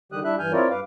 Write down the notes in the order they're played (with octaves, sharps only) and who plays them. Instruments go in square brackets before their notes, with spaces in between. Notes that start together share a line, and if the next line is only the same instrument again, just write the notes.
[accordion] D3 D#3 G3 G4 D#6 F#6
G3 D4 E4 E5 F#6
G2 E3 G#5 F6 G6
C4 E4 F4 A#4 C#5 D5
G2 B4 F5 D6